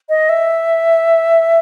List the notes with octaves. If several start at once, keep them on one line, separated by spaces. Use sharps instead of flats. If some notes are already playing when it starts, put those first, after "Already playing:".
D#5
E5